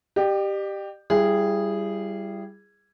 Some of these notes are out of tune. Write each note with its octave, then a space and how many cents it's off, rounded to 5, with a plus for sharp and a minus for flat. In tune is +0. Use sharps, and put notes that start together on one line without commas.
G4 +0 D5 +45
G3 +0 E4 +40 G#4 -10